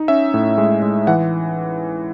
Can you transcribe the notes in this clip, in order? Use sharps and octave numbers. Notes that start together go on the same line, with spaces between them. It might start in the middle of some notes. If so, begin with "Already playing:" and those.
Already playing: D#4
C#4 E5
A2
G#3
G#3
E3 F#5